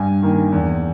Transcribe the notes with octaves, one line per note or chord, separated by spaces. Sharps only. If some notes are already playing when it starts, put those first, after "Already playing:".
Already playing: G2 G#5
D#3 A#3
E2